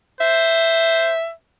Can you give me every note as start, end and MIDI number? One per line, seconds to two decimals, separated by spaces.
0.21 1.14 72
0.21 1.30 76